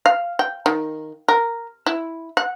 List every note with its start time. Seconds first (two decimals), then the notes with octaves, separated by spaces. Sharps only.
0.06 F5
0.39 G5
0.66 D#3
1.28 A#4
1.86 E4
2.37 F#5